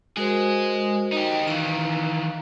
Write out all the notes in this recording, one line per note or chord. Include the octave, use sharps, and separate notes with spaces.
G#3 F#4 G#4 A#4 C5
D#4 G4
D#3 E3 F5 A#5